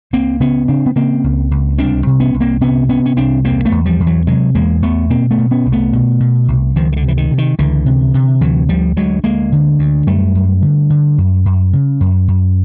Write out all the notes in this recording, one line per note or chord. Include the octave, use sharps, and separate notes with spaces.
C#2 A#3 C4
C#3 B3 C#4
C#3 C4 D4
B3
C#3 A#3 C4
C#2
C#2
C2 C4 D4
C3
B3 C#4
C2
A#3 C4
C3 B3 C#4
C3 B3 C#4
C#4
C2 C4 D4
E2 A#3 C4
A3 B3
E2
F3 G3
E2
E3 F#3
C3 F#3 G#3
E2 G#3 A#3
E2 A3 B3
B2 A#3 C4
A3 B3
B2
B3 C#4
C2
A3 B3
B2
B2
C2
C#2 D#3 F3
D#3
D3
C3
E3
D#3
C3
D#3
C#2 D3 E3
C3
C3
D2 E3 F#3
D2 F3 G3
D2 F#3 G#3
D2 G#3 A#3
D3
D2
F#2 G3 A3
F#2
D3
D3
F#2
F#2
C#3
F#2
F#2